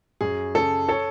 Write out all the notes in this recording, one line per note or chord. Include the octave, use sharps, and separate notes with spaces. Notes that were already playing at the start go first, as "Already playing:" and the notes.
F#2 G#4
C#3 A4
A4 C#5